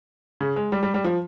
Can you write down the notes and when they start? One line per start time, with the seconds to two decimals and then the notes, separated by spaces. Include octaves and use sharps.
0.41 C#3
0.56 G#3
0.72 G3
0.83 G3
0.94 G3
1.04 F3